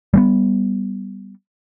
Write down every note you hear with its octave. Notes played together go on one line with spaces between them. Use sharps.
G3 G#3 B3